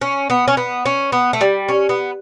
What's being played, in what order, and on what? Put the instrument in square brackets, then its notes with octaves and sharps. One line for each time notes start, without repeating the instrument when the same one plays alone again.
[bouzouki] C#4
B3
C#4
B3
C#4
B3
A3
G3
C#4
B3